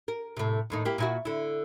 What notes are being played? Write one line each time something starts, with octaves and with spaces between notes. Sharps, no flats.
A#4
A2 C3
D#2 A2 D#4
A#3 E4 G4
A#2 E4 F#4
D3 E4